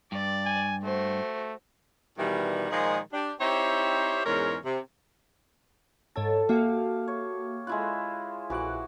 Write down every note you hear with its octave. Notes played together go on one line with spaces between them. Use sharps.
G2 D5
G#5
A3 F#4 C5
B2 D#3 E3 G3
A#2 D#3 F3 G#3
D4 G4
C4 D#4 E4 G4 C5 C#5
E2 G#2 G#3 C#4 A#4 C#5
C3
G#2 A4 C#5 A6
A#3 F#4 G4 E5 F5
C#5
G#3 E4 F4 F#6
A#1 E3 F#4 D6 F#6